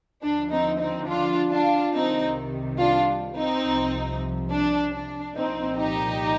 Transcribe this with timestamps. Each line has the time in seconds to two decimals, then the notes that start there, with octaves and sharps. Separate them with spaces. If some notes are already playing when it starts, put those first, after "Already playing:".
0.23 D#2 D3 F3 D4
0.51 C4 D#4
0.79 C4 D#4
1.08 D4 F4
1.51 D4 F4
1.93 C2 C3 D#3 G3 C4 D#4
2.79 D4 F4
3.36 C4 D#4
3.64 C2 C3 F3
4.50 D4
4.92 D4
5.35 C2 A#2 F3 C4 D#4
5.78 D#4 G4